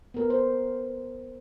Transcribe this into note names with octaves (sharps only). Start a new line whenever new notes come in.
B3 A#4
C5